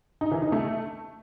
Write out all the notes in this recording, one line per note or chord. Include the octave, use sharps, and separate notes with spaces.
D#4
E3
D#4
A3